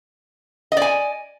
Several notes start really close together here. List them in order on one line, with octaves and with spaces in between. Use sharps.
D#5 D5 G#5